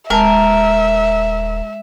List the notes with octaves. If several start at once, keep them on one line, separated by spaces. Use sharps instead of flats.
D#1 G#3 A#4 E5 A5